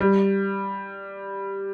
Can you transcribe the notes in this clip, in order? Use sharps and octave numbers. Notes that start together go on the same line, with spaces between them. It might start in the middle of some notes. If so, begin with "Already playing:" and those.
G3